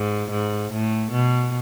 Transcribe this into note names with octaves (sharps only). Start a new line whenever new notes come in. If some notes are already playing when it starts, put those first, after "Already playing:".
Already playing: G#2
G#2
A2
B2